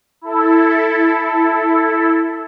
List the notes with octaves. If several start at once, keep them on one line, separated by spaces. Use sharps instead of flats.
E4 A4